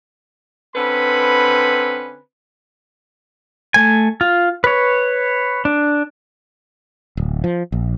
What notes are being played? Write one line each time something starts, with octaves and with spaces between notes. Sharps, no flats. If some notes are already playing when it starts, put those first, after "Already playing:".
D3 C4 C#4 B4 B5
A3 G#5
F4
B4 C#5
D4
D1
F3
A#1